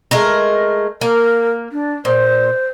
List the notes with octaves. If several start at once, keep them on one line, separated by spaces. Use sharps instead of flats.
G#3 A3 A#4
A#3 A#4
D4
A#2 C5